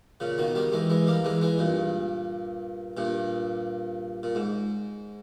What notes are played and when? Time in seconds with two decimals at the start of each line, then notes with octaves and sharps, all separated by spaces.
0.20 A#2 C#3
0.38 B2 D#3
0.55 D#3 G3
0.72 E3 G#3
0.90 E3 G#3
1.07 G3 A#3
1.24 E3 G#3
1.42 E3 G#3
1.59 G2 A#2
2.97 G2 A#2
4.23 A#2
4.35 G#2